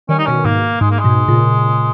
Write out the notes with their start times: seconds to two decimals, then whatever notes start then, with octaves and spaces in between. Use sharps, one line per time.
0.09 D#3 G3 C#4
0.18 D#4
0.26 B2 D#3 C#4
0.45 G#2 B2 A#3
0.81 G#2 G#3
0.91 A#3
0.99 G#3
1.04 G#2 B2
1.28 A#2 C#3